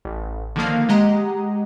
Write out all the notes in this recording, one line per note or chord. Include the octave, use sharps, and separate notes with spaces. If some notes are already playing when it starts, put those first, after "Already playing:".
A1
D3 D#3 F3 A#3 F5
G#3 G4 D#5 F#5 A#5